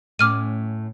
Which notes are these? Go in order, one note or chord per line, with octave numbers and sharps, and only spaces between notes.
A2 C#4 D6 F6 D#7